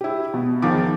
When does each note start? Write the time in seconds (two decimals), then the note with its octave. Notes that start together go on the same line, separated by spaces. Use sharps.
0.01 E4 G4
0.34 B2
0.62 E2 D#3 F3 D6